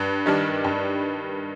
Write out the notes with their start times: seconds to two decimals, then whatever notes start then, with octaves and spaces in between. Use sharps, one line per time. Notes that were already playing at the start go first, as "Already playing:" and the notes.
Already playing: G2
0.26 D#3 G3 D4
0.65 G2